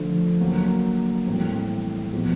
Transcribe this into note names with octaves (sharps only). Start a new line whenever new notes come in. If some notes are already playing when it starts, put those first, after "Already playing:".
Already playing: D3 F3 A3
D3 F#3 A#3
A2 E3 G3 C4
A#2 F3 G#3 B3